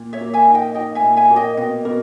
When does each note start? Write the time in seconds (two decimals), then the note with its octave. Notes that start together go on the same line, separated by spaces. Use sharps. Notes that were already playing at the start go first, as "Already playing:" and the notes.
Already playing: A#2
0.13 C#5 E5
0.21 A#3
0.33 E5 G#5
0.48 D#4
0.54 D#5 G5
0.74 D#4 D#5 G5
0.95 E5 G#5
1.03 A#2
1.16 E5 G#5
1.30 A#3
1.36 D#5 G5
1.57 B2 D#5 G5
1.85 B2 A#4